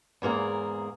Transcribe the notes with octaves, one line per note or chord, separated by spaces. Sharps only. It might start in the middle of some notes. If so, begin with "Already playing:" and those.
E2 G#2 A#3 G#4